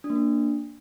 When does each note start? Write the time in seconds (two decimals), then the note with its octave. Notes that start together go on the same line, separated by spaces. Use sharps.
0.04 D4
0.10 A#3
0.15 D4